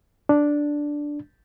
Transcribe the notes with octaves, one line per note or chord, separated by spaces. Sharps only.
D4